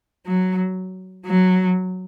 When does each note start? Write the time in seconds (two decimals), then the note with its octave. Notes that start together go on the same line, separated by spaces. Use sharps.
0.27 F#3
1.26 F#3